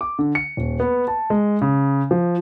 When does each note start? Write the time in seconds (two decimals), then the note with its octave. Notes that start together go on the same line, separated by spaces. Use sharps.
0.01 D6
0.19 D3
0.35 C#7
0.57 D#1
0.80 B3
1.08 A5
1.30 G#3
1.62 C#3
2.11 F3